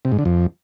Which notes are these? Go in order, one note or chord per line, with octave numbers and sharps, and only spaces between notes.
C3
G#2
D3
F2